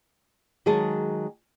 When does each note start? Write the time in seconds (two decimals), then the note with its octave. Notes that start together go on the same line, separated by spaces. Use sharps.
0.66 D#3 F#3 G#3 G#4 A5